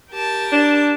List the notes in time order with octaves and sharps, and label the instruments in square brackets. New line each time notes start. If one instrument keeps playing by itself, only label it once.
[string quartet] G4 A#4 A5
[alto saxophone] D4